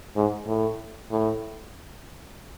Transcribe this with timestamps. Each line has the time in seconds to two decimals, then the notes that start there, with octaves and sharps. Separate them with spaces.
0.16 G#2
0.47 A2
1.11 A2